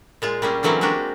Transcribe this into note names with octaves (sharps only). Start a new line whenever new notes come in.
A#2 G#3 F4
G3 A#3 C#4 G#4
D3 E3 F#3 A#3 C4 C#4
G#3 A#3 D4 F#4 G4